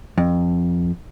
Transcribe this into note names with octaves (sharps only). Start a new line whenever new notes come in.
F2